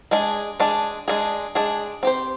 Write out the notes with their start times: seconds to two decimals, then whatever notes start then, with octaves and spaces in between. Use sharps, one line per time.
0.11 G#3 D4 G#4
0.60 G#3 D4 G#4
1.08 G#3 D4 G#4
1.55 G#3 D4 G#4
2.03 C4 G4 C5